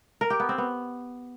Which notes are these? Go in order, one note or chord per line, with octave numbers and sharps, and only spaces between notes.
A#4
G4
B3
C4
B3